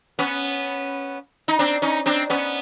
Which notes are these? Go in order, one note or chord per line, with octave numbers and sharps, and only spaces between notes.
B3 C#4
D#4
C4 D4
C#4 D#4
C4 D4
B3 C#4